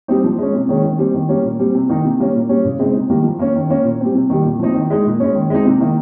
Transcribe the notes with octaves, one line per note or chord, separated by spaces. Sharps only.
G3 C4 D#4
F3
G#3 C#4
C3
D#3 G#3 C#4
D#3
G3 C4
D#3
G3 A#3 C#4
A#2
G3 C4
C3
D#3 A#3 D#4
C3
G3 A#3 C#4
A#2
G3 C#4
C#3
G#3 C4 D#4
C3
D#3 G3 A#3
F3
A#3 C#4
D#3
A#3 C#4
A#2
G3 C4
C3
D#3 G3
A#2
F3 C4 D#4
D#3
G#3 D#4
A#2
G#3 C#4
D#3
G#3 C4 D#4
C3
D#3 A#3 D#4